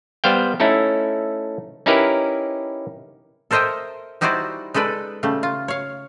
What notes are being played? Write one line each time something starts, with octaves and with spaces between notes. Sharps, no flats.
G3 B3 C5 F5 G5
A3 C#4 D#4 E4 A4
C#4 D#4 E4 G4 A#4 B4
A4 A#4 C5 D#5 E5 G5
G3 D#4 E4 F#4 C5 D5
G#3 D#4 A4 B4 D5
C#3 G3 A3
F4
C#5 F5